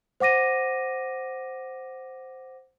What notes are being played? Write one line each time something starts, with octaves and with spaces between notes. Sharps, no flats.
C5 F#5 D6 A#6 D#7